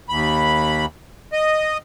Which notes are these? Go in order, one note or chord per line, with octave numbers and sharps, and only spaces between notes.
D#2 B5
D#5